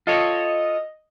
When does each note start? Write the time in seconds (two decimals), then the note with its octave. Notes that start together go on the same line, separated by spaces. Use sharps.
0.07 F4 A4 C#5 D#5